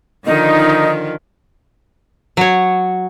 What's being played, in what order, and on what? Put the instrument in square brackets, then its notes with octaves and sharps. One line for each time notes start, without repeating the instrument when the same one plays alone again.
[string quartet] D3 D#3 F3 [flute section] D#4
[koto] F#3 C#5